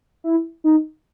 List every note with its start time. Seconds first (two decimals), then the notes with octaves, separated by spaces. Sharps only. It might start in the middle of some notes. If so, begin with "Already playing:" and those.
0.24 E4
0.64 D#4